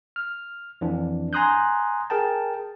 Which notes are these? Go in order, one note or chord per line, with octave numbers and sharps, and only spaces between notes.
F6
F2 E3 D4
G#5 A#5 C6 D#6 F#6 G6
G#4 A#4 G5 A5